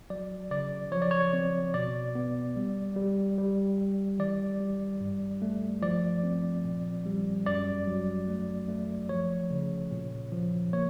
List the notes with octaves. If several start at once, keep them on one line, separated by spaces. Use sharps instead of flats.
F#3 D5
C#3 D5
F3 C#5
D5
C#5
C4
B2 D5
B3
G3
G3
G3
G3
E3 D5
G3
G2
A3
F3 D5
C4
A#2
G3
F#2 D5
F#3
A3
A3
F3 C#5
C#3
A#2
F3
A#3 C#5